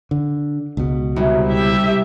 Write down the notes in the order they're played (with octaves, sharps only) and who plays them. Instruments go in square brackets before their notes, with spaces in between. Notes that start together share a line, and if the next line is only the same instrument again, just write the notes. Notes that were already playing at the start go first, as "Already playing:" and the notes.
[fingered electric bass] D3
C#2 B2
[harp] C2 [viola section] F#3
[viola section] E4 G4 E5